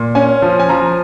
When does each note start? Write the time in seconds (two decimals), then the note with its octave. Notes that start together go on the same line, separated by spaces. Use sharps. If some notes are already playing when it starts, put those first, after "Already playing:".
Already playing: A#2
0.15 C#4 G#5
0.42 F3
0.59 G#5
0.69 F3 A#5